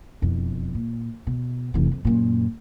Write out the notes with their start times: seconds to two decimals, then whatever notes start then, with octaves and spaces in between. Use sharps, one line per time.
0.22 E1 F2
0.75 A#2
1.27 B2
1.74 F1 E3
1.91 F2
2.05 F#2 A#2